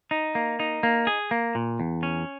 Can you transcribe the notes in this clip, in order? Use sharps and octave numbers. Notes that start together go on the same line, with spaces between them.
D#4
A#3
D#4
A#3
G#4
A#3
A#2
E2
C#4